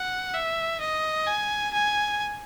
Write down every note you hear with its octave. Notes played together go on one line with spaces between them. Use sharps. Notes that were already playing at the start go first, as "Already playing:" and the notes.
Already playing: F#5
E5
D#5
G#5
G#5